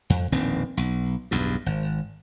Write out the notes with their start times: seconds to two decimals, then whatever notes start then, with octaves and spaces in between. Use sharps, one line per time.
0.10 F2
0.32 E1 A#1 D#3 C4
0.77 B1
1.31 B1 E2 G2
1.66 G#1